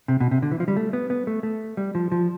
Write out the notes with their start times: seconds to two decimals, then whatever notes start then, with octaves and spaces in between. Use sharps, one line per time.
0.08 C3
0.20 B2
0.31 C3
0.42 D3
0.52 E3
0.60 F3
0.68 G3
0.77 A3
0.93 B3
1.10 B3
1.27 A3
1.43 A3
1.77 G3
1.95 F3
2.12 F3